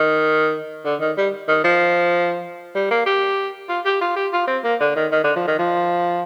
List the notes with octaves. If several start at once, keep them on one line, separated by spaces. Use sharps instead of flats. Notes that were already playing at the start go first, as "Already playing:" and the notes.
Already playing: D#3
D3
D#3
G3
D#3
F3
G3
A#3
G4
F4
G4
F4
G4
F4
C4
A#3
D3
D#3
D#3
D3
F3
D#3
F3